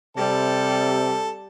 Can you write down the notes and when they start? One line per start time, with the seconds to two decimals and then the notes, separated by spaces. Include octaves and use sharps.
0.17 C3 G3 A4